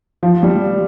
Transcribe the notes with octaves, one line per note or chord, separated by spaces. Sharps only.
F3
G3